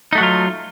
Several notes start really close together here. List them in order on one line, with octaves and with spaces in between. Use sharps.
D#4 A3 F#4 F#3 F4